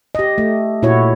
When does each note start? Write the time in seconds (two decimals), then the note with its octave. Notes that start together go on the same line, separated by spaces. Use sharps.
0.15 G4 D#5
0.38 A3
0.83 A#2 E4 F#4 C#5